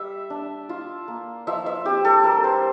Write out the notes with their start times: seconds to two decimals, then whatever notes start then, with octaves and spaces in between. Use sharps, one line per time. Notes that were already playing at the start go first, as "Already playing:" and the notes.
Already playing: G3 E5
0.30 D4
0.69 F4
1.08 A#3
1.47 F3 E5
1.66 E5
1.85 C4 G4
2.05 A4
2.24 G3 A#4
2.44 C5